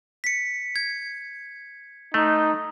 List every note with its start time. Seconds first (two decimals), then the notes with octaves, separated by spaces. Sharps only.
0.24 B6 C#7
0.76 G#6
2.14 A3 D#4